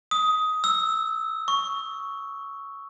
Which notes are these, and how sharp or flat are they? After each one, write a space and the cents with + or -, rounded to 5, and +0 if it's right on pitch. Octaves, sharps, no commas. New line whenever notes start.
D#6 +15
E6 -10
C#6 +5